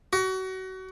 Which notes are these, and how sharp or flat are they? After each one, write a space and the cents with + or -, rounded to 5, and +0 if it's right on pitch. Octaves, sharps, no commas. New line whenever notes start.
F#4 +30